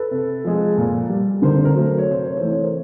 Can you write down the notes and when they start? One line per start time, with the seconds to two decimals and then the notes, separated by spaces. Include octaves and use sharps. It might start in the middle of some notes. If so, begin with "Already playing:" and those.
Already playing: A4 B4
0.11 C3
0.44 F3 G#3
0.78 A#2
1.09 G3
1.42 D3 A#4 C5
1.64 A#4 C5
1.75 F#3 A3
1.87 C5
1.98 C#5
2.08 C3 C5
2.24 C#5
2.37 E3 A3 C5
2.50 C#5
2.62 A#4 C5